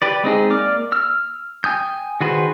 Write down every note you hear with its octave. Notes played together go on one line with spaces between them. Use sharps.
G4 B4 D5
G#3 C4 D#4 G#4
A#3 D5 D6 F6
E6 F6
G5 G#5 D#6 G6
D#3 F#4 G#4 B4 C5